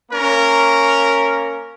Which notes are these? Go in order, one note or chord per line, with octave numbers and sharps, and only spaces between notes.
A#3 C#4 A#4